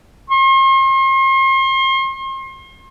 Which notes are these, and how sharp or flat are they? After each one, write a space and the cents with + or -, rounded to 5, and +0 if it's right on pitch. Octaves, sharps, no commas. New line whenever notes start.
C6 +40